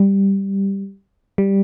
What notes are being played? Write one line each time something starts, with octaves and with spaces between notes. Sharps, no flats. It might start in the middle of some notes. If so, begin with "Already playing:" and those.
Already playing: G3
G3